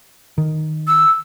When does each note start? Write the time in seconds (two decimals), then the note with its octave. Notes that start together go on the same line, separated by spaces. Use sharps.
0.38 D#3
0.87 E6